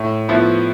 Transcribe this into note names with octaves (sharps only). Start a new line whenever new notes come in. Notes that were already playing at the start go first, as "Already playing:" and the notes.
Already playing: A2
F3 B3 E4